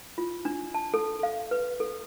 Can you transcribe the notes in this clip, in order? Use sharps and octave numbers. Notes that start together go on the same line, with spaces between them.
F4
D4
A5
A4
F5
B4
A4